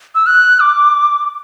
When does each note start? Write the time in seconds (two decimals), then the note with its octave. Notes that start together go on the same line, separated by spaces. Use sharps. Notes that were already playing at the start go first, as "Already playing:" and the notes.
0.15 E6
0.26 F#6
0.60 D6